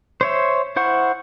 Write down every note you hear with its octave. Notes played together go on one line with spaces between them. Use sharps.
C5 C#5 E5
E4 C5 F#5 C#6